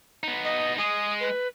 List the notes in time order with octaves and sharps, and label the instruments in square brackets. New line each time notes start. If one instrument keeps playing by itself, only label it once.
[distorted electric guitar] B3 D#4
[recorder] D#5
[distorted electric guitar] G#3 [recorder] D#6
[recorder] B4